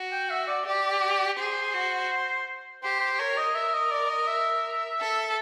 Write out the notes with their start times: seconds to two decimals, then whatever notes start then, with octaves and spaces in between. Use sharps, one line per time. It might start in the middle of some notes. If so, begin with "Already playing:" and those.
Already playing: F#4
0.12 G5
0.30 E5
0.47 D5
0.65 G4 D5
1.38 G#4 C5
1.73 F#4
2.83 G4 C5
3.00 C5
3.19 A#4 C#5
3.37 D#5
3.55 A#4 E5
3.74 D#5
3.91 D5
4.09 D#5
4.27 E5
5.00 A4